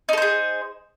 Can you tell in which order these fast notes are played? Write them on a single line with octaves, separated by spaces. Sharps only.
D#4 A4 C5 G#4